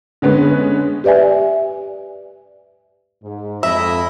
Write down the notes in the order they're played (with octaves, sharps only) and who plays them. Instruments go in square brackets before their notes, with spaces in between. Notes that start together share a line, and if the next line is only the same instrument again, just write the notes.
[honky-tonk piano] D3 G#3 B3 C#4
[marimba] G4 B4 D5 E5 G#5
[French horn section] G#2
[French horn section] F2 [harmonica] E4 D#5 B5 [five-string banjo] E5